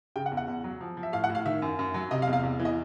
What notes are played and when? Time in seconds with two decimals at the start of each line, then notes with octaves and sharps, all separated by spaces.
0.16 C#3 G5
0.26 F#5
0.32 E2
0.37 F#5
0.48 E2
0.64 F#3
0.81 F3
0.97 F3
1.03 E5
1.13 A2 F5
1.24 F#5
1.29 A2
1.35 F5
1.45 D#3 E5
1.62 F#2
1.79 F#2
1.94 F#3
2.11 C3 D#5
2.22 F5
2.28 E2
2.33 F5
2.43 E2
2.59 E3
2.65 D#5